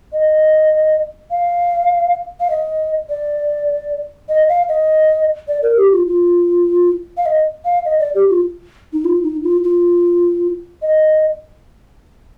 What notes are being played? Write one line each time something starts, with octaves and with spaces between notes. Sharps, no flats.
D#5
F5
F5
D#5
D5
D#5
F5
D#5
D5
A#4
G4
F4
F4
F5
D#5
F5
D#5
D5
G4
F4
D#4
F4
D#4
F4
F4
D#5